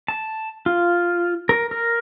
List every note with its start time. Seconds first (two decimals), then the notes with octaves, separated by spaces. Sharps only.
0.08 A5
0.66 F4
1.49 A#4
1.71 A#4